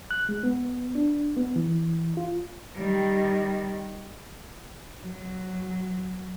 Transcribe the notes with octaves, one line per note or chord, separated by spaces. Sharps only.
F#6
G#3
B3
D4
B3
E3
F4
D#3 G3
F#3